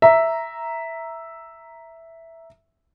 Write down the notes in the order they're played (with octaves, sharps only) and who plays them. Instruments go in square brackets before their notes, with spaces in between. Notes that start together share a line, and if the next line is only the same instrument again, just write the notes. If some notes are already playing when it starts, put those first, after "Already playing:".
[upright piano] E5 A#5